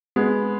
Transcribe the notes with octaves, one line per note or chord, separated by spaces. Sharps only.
G#3 B3